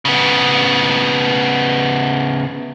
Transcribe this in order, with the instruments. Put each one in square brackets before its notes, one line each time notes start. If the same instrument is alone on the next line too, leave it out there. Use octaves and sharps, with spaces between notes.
[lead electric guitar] C#3 B3